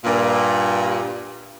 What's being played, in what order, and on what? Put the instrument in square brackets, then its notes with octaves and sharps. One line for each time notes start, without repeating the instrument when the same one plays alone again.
[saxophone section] G2 A#2